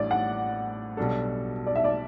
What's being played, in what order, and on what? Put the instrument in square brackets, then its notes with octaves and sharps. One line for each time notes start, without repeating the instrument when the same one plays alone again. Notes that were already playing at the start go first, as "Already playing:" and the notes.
Already playing: [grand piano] A1 A2 G3 D4 [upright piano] D5
[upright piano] F#5
[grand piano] B1 B2 G3 D4 A4
[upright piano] D5
E5
D5